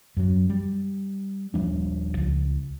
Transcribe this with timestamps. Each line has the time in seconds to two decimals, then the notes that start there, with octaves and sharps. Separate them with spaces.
0.17 F#2 F#3
0.50 G3
1.54 D#1 F3 G3 D4
2.17 C#2